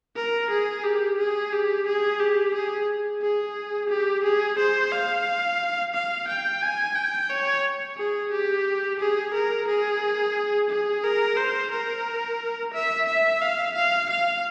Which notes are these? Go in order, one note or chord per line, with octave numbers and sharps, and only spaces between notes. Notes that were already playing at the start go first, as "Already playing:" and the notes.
A#4
G#4
G4
G#4
G4
G#4
G4
G#4
G#4
G4
G#4
C5
F5
F5
G5
G#5
G5
C#5
G#4
G4
G#4
A#4
G#4
G#4
A#4
C5
A#4
E5
E5
F5
F5
F5